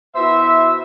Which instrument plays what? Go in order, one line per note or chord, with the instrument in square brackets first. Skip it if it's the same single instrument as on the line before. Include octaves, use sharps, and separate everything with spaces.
[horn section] B2 E4 C5 E5